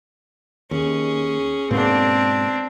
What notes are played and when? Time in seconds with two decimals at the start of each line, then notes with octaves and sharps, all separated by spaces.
0.71 D#2 C#4 G#4
1.71 G#2 B2 A#3 C4 D4